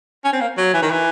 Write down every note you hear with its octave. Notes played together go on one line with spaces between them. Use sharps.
C#4
C4
A#3
F#3
E3
D#3
E3